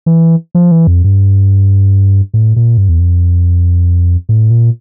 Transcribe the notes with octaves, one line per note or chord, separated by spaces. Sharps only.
E3
F3
E3
F2
G2
A2
A#2
G2
E2
F2
A2
A#2